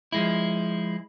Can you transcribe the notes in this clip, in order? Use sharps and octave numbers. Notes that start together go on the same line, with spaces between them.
F3 G#3 E4